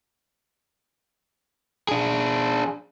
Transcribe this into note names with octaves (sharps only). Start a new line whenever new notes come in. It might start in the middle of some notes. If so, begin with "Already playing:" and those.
D4 G#4